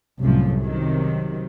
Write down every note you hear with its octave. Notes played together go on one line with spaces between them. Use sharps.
C2 F#2 A2 F3
C3 D#3 F#3